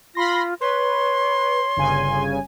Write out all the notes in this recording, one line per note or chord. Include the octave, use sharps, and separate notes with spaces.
F4 B5 C6 A#6
B4 C#5 C6
G1 C#3 G#5